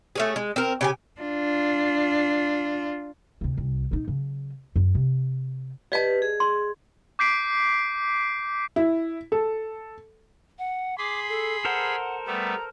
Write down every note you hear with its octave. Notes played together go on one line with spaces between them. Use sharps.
A3 C#4 G#4
G#3
C4 A#4
C#3 G4 G#5
D4 F4
D2 C3
C2
A#1 D#4
C#3 F#3
F#2
C3
G4 B4 D5 D#5 A5
G#4
C6
D6 G6 B6 C7 D7
E4
A4
F#5
G#4 B5 C6 D6
A4
A4 A#4 C5 F#5
G3 A3 B3 A#5